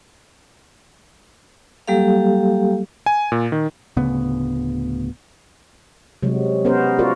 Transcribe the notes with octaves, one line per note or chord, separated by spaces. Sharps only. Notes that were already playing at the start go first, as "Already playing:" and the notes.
F#3 G3 A#3 G4 A4 F5
G#5
A#2
D#3
D1 D2 C#3 B3
C3 F#3 G#3
B3 C#4 A#4 C5
F4 F#4 A#4 D5